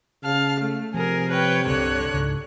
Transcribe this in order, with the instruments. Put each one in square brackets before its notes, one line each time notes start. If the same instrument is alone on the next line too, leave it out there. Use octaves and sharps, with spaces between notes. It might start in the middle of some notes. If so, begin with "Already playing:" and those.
[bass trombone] C#3 [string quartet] F5 A5 F6
[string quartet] A3
[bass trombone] C3 [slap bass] F3 [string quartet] G#4 A#4
[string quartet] B4 C#5 G5
[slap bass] C2 G2 [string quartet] D3 C#5 F#6
[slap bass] C#2 G#2